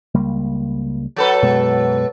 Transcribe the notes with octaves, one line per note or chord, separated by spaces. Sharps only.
C#2 G3 A#3
F#3 A4 B4
F#2 B2 G#3